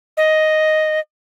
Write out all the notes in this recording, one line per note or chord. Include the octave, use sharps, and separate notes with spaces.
D#5